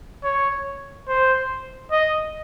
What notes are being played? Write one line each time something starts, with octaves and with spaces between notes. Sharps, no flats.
C#5
C5
D#5